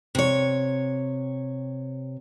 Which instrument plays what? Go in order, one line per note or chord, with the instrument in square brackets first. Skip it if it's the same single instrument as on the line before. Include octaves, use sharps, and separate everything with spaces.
[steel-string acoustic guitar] C3 C#5